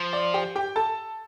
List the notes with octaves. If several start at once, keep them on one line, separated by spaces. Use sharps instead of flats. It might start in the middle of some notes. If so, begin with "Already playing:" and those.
Already playing: F3
D5
G4 G5
G4 G5
A4 A5